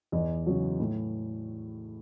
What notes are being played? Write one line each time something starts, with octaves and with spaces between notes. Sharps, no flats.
E2 D#5
C#3 F#3
A2